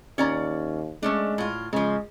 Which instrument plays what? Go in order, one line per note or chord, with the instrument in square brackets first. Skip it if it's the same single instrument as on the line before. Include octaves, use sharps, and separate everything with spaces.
[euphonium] D#2 [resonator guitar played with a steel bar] C#4 D5 A#5
[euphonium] G#3 [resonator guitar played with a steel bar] A3 C#4 D4
[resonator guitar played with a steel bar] A2 F4
[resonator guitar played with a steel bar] C#3 F3 [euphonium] G#3